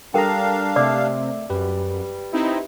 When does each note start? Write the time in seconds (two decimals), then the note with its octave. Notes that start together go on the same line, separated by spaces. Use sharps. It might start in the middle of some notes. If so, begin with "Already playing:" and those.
0.14 G3 D4 A4 A#4 F5 G5 A#5
0.76 C3 A3 D5 E5 D6 E6
1.50 F#2 G3 G4 B4
2.32 C4 D#4 E4